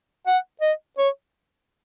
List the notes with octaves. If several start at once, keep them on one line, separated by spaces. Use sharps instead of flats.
F#5
D#5
C#5